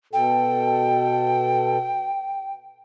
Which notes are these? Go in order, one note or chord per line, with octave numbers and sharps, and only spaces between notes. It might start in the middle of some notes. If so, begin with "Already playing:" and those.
B2 A4 G5